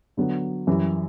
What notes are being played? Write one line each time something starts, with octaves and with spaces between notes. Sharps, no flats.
D3 F#3 B3
F#2 E3 G3